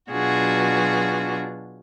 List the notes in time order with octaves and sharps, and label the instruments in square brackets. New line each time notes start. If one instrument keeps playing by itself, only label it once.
[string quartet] B2 F#3 D4 F4 F#4 G#4